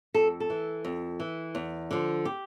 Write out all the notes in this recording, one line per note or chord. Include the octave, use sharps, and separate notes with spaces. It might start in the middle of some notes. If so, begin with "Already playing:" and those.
F2 A4
A4
E3
F2
E3
E2
D3 F3
G4